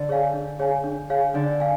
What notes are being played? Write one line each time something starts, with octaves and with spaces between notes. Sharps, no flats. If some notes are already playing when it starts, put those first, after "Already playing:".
Already playing: D3
G#4 C#5 F5 G#5
D4
G#4 C#5 F5 G#5
D4
G#4 C#5 F5 G#5
D3 D4
F5 G#5